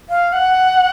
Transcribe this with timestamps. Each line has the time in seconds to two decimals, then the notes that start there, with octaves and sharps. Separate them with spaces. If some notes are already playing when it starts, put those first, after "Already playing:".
0.10 F5
0.33 F#5